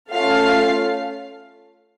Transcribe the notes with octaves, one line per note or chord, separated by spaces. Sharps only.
A3 C#4 F4 A4 F5